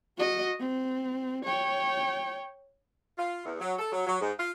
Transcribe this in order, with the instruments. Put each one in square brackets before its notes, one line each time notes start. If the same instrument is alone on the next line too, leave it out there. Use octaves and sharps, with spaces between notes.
[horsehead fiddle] F#4 D#5
C4
C#5 G5
[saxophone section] F4
E2
F#3
A4
F#3
F#3
G#2
F4